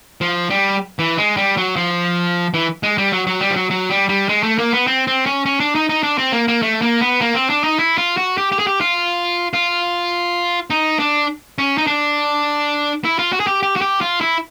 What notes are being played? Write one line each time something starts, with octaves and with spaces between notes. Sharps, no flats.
F3
G3
E3
G#3
G3
F#3
F3
E3
G#3
G3
F#3
F#3
G3
F3
F#3
F#3
G3
G3
G#3
A3
A#3
B3
C4
C4
C#4
C#4
D4
D#4
D#4
D4
C4
A#3
A#3
A3
A#3
B3
A#3
C4
D4
D#4
E4
F4
F#4
G4
G4
G#4
G4
F4
F4
D#4
D4
C#4
D#4
D4
E4
F4
F#4
G#4
G4
G4
F#4
G4
F4
E4